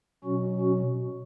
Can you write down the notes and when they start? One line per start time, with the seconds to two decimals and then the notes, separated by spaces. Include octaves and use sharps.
0.24 B2 F#3 C#4 F#4
0.60 C#4 F#4